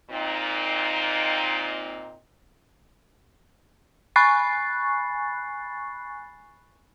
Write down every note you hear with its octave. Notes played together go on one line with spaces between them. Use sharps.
A#2 C4 D#4
G#5 B5 C#6 F#6 A6 C7